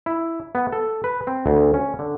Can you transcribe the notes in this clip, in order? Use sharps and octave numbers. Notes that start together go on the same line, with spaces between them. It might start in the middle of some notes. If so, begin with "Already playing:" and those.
E4
B3
A4
B4
C4
D2
C#4
D3